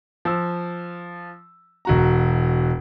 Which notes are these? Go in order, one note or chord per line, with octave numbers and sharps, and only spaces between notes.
F3 E6
E1 F#4 A#5